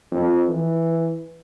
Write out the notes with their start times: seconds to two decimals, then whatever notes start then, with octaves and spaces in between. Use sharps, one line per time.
0.12 F2
0.49 E3